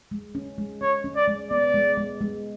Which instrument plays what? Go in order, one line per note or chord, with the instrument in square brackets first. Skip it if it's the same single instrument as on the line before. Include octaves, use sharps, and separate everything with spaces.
[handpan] G#3
C#4
G#3
[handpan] C#4 [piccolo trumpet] C#5
[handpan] C#4
[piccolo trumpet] D5
[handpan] G#3
[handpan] B3 [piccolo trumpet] D5
[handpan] G#3
G#3
G#3